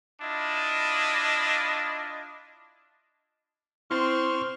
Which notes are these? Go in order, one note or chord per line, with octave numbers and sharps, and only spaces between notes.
D4 E4 F4 D#5
C4 E4 C6 C#6 F6